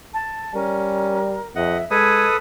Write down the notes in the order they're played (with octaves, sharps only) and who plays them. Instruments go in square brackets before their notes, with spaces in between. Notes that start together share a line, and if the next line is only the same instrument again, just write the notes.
[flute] A5
[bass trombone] G3 [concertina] C#4 [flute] A#4
[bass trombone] F2 [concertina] D#5 F#5 [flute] E5
[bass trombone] G#3 [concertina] A4 B4 D#6 [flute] G#6